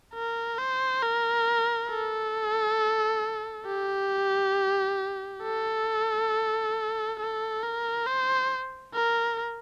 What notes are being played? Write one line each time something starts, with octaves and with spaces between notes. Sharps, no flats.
A#4
C5
A#4
A4
G4
A4
A4
A#4
C5
A#4